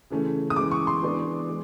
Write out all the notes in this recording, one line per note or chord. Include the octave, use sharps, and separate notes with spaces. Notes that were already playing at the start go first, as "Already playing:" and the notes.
C#3 E3 A3 C#4
D#6
E3 G#3 C#4 D6
C#6
C6
E3 G#3 B3 D4
G#3